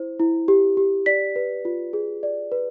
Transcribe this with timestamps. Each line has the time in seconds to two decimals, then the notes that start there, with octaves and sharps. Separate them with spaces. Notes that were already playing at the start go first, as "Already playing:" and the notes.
Already playing: E4 C5
0.20 E4
0.48 G4
0.77 G4
1.06 D5 B6
1.36 B4
1.65 F4
1.93 G#4
2.23 D5
2.52 B4